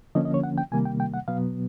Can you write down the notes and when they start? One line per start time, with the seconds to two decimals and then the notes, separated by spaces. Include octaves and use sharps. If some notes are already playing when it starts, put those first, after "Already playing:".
0.15 D3 F3 A#3 C#4 D#5
0.25 D#5
0.34 C#5
0.44 F#5
0.58 G5
0.72 C3 D#3 G3 A#3 G#5
0.85 G5
1.00 G5
1.14 F#5
1.28 B2 F#3 B3 F5